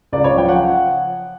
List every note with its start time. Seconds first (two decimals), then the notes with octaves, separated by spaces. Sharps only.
0.12 C#2 D5
0.24 C#5
0.36 F3 G5
0.48 F#5